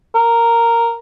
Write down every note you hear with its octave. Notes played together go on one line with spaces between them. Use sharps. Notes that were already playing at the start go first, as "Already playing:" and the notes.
A#4